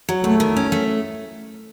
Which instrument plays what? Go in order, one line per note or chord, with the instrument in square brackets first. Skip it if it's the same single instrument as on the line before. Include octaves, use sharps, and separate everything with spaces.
[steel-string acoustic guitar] F#3
[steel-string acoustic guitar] E2 [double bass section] A3
[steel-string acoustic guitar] D#3
C#4
A3